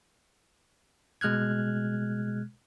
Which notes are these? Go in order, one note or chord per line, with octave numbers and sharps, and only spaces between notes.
B2 G#3 F6 F#6 G#6